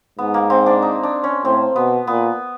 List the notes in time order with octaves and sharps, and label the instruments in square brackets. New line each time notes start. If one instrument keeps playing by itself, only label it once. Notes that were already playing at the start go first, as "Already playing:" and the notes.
[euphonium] G#2 [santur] B3
[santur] A#3
C4
D4
D#4
D4
C#4
[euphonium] A2 [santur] C4
[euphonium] B2 [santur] B3
[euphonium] A#2 [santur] B3